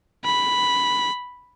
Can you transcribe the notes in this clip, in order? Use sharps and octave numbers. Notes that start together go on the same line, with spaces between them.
B5